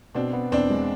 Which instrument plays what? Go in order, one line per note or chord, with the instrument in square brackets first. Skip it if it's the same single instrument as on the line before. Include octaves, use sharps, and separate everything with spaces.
[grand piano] B2 [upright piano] C4 D4
[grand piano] B3
[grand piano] E2 [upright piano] C4 D4
[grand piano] G#3